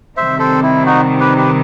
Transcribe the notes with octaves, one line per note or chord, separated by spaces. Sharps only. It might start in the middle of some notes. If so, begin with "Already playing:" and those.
C3 D#3 G3 C4 C5 E5
A4 C5
E4
D#4 F#4
G4 B4
G4 B4